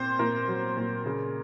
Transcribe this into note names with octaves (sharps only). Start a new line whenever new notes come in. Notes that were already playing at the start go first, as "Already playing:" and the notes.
Already playing: A#2 C4 C5
A#2 A#4
F#3
A#2
C#3